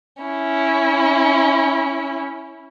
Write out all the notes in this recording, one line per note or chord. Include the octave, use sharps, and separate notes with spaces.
C#4 E4